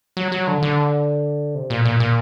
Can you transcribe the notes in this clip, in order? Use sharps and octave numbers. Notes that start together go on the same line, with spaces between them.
F#3
F#3
D3
D3
C3
A#2
A#2
A#2